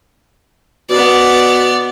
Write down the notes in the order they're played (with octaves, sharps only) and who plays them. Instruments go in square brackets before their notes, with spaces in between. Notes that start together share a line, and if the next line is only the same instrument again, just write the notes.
[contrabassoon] B2 [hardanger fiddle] B3 D5